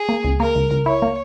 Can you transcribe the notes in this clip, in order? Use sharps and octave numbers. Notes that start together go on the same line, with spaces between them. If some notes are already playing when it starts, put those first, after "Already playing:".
Already playing: G#4
A#3
C#2
A#3 A#4
C#2
C#2
E4 C#5
A#3